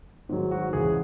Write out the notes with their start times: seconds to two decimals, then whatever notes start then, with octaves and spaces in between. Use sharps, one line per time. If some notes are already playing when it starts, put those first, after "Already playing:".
0.29 G#2 D#3 F#3
0.51 F#4
0.73 C#2 C#3 E3 G#4